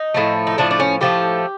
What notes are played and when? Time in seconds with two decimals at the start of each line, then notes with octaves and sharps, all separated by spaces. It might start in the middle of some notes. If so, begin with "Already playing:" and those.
Already playing: D#4
0.14 A2 F3 A3
0.47 D#4
0.58 A2 F3 A3 D4
0.71 D4
0.80 C#4
1.01 A2 F3 A3 G4